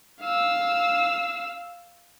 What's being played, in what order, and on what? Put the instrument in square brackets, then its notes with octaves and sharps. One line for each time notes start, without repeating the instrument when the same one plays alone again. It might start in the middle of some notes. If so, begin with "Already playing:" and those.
[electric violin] F5 E6